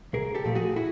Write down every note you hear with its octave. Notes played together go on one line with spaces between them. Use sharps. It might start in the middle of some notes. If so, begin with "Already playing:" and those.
C2 G#4 A#4
G4 A4
A#2 F3 A3
F#4 G#4
E4 F#4